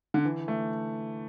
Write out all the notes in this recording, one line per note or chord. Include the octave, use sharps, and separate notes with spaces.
D3
E3
A3